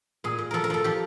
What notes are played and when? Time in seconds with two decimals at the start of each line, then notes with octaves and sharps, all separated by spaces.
0.24 A#2 G#4
0.38 A#2
0.51 F3 A4 A#4
0.64 A#4
0.70 F3 A4
0.84 F3 G4